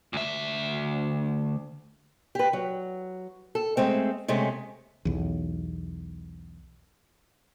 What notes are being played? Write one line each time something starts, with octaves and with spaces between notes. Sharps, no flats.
D2 E5
G4 B4
F#3
A4
G#3 A3 C4
C3 G#3 A3 C#4
B1 E2